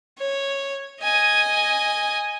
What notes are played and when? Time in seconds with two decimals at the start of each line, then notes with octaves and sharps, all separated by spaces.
0.18 C#5
1.02 D#5 G#5